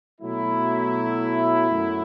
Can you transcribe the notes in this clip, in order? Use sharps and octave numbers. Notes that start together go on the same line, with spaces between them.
B2 F#3 A3 E4
F#2 F#3 A3